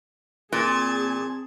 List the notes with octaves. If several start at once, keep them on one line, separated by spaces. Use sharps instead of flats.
A#2 C4 G#4 A5 G#6